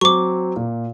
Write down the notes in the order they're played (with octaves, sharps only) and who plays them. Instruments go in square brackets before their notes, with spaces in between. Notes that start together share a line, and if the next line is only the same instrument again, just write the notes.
[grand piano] F#3 C4 [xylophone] C#6 D6
[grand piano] A#2